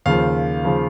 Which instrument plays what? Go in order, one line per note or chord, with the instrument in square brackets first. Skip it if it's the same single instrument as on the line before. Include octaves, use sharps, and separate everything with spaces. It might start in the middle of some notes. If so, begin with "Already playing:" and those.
[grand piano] D#2 C#3 F3 F5
C#3 F3